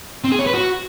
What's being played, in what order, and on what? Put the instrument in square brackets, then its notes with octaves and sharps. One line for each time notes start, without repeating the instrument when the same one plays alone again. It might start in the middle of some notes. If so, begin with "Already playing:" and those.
[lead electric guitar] C4
G#4
C#5
B4
F#4